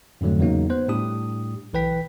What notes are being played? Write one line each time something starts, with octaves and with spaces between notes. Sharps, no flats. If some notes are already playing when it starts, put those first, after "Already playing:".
F2 G#2 D3 F#3 A3
E2 C#3 F#3 G#3 A#3 D#4
B3 C5 F#6
A2 G3 D4 G4 D#6
B1 E3 B4 G5 B6